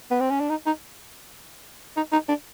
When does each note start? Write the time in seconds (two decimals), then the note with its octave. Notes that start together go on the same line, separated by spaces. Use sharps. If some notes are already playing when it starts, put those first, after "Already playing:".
0.11 B3
0.21 C4
0.30 C#4
0.40 D4
0.50 D#4
0.66 D#4
1.97 D#4
2.12 D#4
2.29 D4